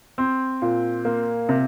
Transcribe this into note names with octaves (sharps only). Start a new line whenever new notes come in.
C4
A#2
A#3
C3